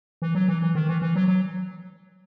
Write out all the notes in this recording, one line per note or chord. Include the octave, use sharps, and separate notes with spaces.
E3
F#3
E3
E3
D#3
E3
E3
F#3
F#3